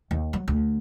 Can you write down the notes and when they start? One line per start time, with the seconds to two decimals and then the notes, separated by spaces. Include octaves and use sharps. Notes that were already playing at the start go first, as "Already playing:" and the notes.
0.11 D#2
0.33 F#3
0.48 D2